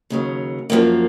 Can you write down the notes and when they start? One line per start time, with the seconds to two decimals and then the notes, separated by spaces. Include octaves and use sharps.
0.10 D#2 C#3 F#3
0.70 F#2 F3 A#3